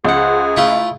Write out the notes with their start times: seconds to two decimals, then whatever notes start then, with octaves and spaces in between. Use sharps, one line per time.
0.05 C#2 G#4 C5 F#5
0.56 A3 E4 F4 D#6